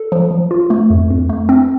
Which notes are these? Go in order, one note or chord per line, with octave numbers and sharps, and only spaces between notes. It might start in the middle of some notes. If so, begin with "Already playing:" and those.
Already playing: A4
F3
F3
F4
A3
F2
F2
A3
C4